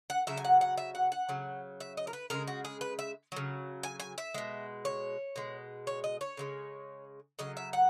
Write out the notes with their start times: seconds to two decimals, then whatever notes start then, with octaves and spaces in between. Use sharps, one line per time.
0.10 F#5
0.27 C#3 F#3 E5
0.37 G#5
0.45 F#5
0.61 F#5
0.77 E5
0.95 F#5
1.12 F#5
1.29 C#3 F#3
1.80 E5
1.97 D#5
2.07 A#4
2.13 B4
2.30 C#3 G#3 A#4
2.48 F#4
2.65 G#4
2.81 B4
2.99 E5
3.32 C#3 F#3
3.83 G#5
4.00 G#5
4.18 E5
4.34 B2 G#3
4.85 C#5
5.36 B2 G#3
5.87 C#5
6.04 D#5
6.21 C#5
6.37 C#3 E3 G#3
7.39 C#3 F#3 D#5
7.57 E5
7.73 F#5